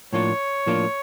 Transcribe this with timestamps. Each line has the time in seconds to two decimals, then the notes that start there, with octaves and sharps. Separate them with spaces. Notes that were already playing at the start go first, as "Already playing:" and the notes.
0.13 A2 F3 A#3 D4 F4 C#5
0.66 A2 F3 A#3 D4 F4